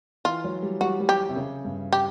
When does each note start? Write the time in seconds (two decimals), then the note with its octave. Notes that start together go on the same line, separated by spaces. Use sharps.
0.25 E3 F4
0.44 F#3
0.62 G3
0.81 G3 F#4
1.00 G3
1.09 G4
1.29 C3
1.36 C#3
1.65 G2
1.93 G4